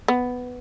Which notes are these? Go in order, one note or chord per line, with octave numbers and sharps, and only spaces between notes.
B3